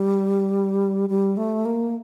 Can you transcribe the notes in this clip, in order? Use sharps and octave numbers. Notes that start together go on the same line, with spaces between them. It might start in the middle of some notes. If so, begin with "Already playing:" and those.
Already playing: G3
G3
A3
A#3